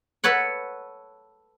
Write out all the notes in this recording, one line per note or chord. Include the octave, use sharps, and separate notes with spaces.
A4 B4 C#5 F#5